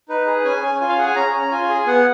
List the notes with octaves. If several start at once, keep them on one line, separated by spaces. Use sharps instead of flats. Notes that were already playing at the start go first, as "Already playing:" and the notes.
D#4 B4
G#4
C#4 G#5
C#4
F4
F5
G#4 F#5
G#5
C#4 A#5
C#4
F4 G#5
G#4
B3 F#5